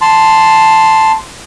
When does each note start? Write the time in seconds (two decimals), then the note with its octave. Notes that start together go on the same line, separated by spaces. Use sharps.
0.01 A5 C6